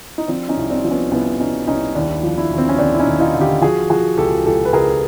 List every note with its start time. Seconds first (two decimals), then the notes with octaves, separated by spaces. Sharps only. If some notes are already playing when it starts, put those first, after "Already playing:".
0.18 D#4
0.28 F3 C4 D4
0.49 C#4 D#4
0.57 C2
0.70 C4 D4
0.84 F3
0.91 B3 C#4
1.11 C2 B3 C#4
1.39 C2 C#4 D#4
1.67 C2 C#4 D#4
1.95 D#2 D4 E4
2.23 F3
2.37 D4 E4
2.51 D#2
2.58 C4
2.69 C#4
2.78 D#2 C4 D4
2.94 E4
3.00 C#4 D#4
3.06 D#2
3.20 D#4 F4
3.34 D3
3.41 F4 G4
3.62 F3 F#4 G#4
3.90 F3 F#4 G#4
4.18 C#2 G4 A4
4.46 C#2 G4 A4
4.65 B4
4.73 C#2 G#4 A#4